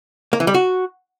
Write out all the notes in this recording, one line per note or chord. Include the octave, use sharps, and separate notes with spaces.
A#3
E3
G3
F#4